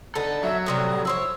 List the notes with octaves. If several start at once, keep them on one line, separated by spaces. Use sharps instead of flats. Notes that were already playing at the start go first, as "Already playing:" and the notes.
D3 B3 D#4 A4
F#3 E5
A2 C3 G3 D#6
E4 C5 C#5 E6